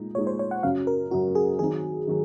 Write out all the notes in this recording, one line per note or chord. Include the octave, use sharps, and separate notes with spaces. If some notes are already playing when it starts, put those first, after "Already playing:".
Already playing: A#2 G#3 D#4
A#2 G#3 D#4 C#5
C5
C#5
F#5
F#2 C#3 F#3 C#4 F5
A#4
F#2 C#3 F#3 C#4 F#4
G#4
D#3 F#3 C4 D#4 G#4
D#3 F#3